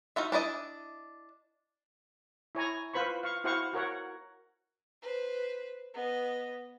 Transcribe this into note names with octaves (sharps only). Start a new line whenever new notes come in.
D#4 F4 F#4 E5
D4 E4 D5 D#5
E4 C#5 G#5 A#5
F4 B4 C5 B5 C#6
F5 C#6
E4 F#4 C5 F5 F#5 C#6
F#4 A#4 C#5 F#5
B4 C5
B3 D#5